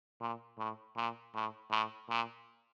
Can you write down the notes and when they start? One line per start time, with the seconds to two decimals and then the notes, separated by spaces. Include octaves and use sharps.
0.21 A#2
0.58 A2
0.96 A#2
1.34 A2
1.71 A2
2.10 A#2